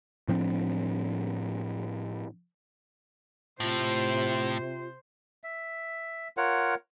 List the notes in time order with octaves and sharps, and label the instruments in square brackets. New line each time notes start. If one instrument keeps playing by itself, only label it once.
[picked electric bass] A2 F3 C4 D4
[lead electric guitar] A2 [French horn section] C3 [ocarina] F4 [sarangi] C5
[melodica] E5
F4 A#4 C#5 F#5